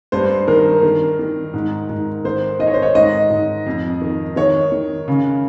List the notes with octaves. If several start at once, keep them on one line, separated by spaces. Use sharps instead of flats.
G2 C5
D#3 A#4
D#3
D#3
G#2
G#2
D#3 C5
D#3 D#5
C#5
C5
C#5
G#2 D#5
G#2
F2
D#3
D#3 C#5
D#3
C#3